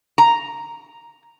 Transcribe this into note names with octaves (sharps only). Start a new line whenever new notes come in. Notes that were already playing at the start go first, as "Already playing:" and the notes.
A#5